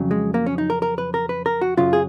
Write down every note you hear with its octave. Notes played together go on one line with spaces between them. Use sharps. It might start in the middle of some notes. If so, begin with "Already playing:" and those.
Already playing: F2 C#3 F#3
G#3
A#3
C#4
D#4
A#4
A#4
B4
A#4
B4
A#4
F#4
F#2 C#3 F#3 F4
G#4